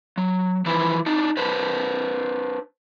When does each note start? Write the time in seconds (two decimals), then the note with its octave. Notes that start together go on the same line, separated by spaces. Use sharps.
0.18 F#3
0.66 E3 F3 E4 B4 C5
1.06 D4 D#4 D5
1.37 D4 B4 C5